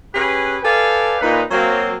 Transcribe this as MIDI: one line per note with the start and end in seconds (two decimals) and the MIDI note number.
0.15 0.57 61
0.15 0.57 67
0.15 0.57 68
0.15 0.57 71
0.63 1.16 69
0.63 1.16 71
0.63 1.16 74
0.63 1.16 77
0.63 1.16 79
0.63 1.16 80
1.21 1.42 46
1.21 1.42 63
1.21 1.42 71
1.51 1.97 54
1.51 1.97 58
1.51 1.97 60